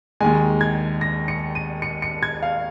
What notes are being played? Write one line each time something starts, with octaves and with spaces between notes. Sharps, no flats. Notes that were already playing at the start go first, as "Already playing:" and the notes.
D#2 D#3 G#3 G#5
G#6
A#6
C#7
D#7
C#7
C#7
G#6
F5